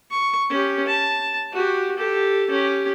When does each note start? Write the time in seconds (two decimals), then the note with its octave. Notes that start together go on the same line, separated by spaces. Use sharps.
0.11 C#6
0.50 C#4 G4
0.87 A5
1.53 F#4 G4
1.96 G4 A4
2.51 C#4 G4